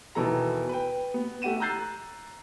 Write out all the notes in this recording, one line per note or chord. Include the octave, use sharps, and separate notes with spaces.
D#2 B2 E3 A4 A#5
B4 G5
B3
A3 G4 F#5 D#7 E7
A#5 E6 F#6 G6 A6 C7